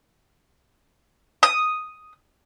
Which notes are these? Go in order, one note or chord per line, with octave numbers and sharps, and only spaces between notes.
D#6